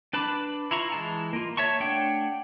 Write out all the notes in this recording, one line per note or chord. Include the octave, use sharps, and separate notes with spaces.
D4 B4 A5 B5 D6
E4 F4 A#5 C#6
E3 G#3 A5
A#3 F4
C#5 E5 A5 C#6
A3 D4 C#5 F#5 G5